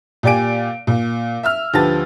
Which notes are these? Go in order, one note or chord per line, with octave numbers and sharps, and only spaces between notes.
A#2 G4 D5 G#5 D7
A#2
E5 E6 F6
D2 F3 G4 B4 A5 A6